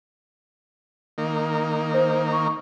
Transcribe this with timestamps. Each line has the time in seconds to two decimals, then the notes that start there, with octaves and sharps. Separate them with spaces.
1.18 D#3 A#3
1.94 C5
2.32 C#6